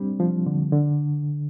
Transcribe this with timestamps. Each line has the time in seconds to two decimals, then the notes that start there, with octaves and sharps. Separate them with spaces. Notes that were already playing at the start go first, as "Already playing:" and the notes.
Already playing: G3 C4 D4
0.20 F3
0.46 D3
0.72 D3